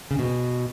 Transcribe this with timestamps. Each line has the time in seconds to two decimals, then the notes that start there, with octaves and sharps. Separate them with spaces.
0.11 C#3
0.19 B2